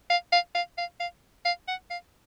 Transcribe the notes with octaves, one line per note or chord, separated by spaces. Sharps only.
F5
F5
F5
F5
F5
F5
F#5
F5